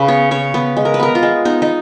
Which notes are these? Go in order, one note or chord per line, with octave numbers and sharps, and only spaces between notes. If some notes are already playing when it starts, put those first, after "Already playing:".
Already playing: C#3 B4
B3 C#5
C#3 C#5
B3 B4
G#3
A#4
B4
B3 A#4
F4
G#3
B3 D#4
D#4